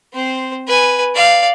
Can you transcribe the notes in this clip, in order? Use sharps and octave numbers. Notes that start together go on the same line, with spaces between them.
C4 C5
B4 G#5
D5 F5